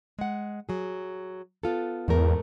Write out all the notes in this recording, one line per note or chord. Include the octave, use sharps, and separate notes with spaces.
G#3 F#5
F#3 G#4
B3 F4 A4
E2 G#2 A3 A#4